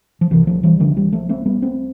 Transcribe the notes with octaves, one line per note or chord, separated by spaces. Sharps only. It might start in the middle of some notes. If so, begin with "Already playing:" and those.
F3
C2 C3 E3
F3 A3
E3 G3
D3 F3
E3 G3
F3 A3
A3 C4
G3 B3
A3 C4